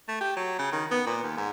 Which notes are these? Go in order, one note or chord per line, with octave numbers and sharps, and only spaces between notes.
A3
G4
F#3
C#3
D#3
B3
A#2
D#2
G#2